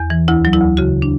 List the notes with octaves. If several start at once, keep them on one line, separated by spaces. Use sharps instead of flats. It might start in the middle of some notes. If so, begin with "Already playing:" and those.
Already playing: E2
E3
D2 E4
F#3
E4
D2
C#3 F#4
D4